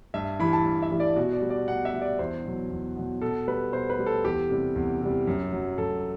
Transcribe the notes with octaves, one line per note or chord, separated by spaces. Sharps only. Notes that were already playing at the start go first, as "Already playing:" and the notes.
G2 E5
E3 G3 B5
A5
G2
E5
E3 G3
D5
B2 F#4
D5
G3
D5
B2 F#5
E5
G3
D5
E2 C5
B2 F#3
E2
B2 F#3
B2 A4
G3 B4
B2 C5
B4
G3
A4
E2 G4
C3 G3
E2
C3 G3
F#2
F#3
F#2 A4